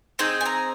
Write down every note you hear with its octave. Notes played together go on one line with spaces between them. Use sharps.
C4 D#4 G#4 G5
G#5
A#5